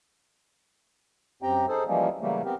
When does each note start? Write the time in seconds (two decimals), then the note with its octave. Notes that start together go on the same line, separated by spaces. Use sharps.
1.43 F#2 C4 G4 G5 A#5
1.68 D#4 G#4 A4 C5
1.87 E3 F3 G3 G#3 A#3 C#4
2.21 C#3 E3 F#3 G3 A3 A#3
2.45 B3 C4 G4 A#4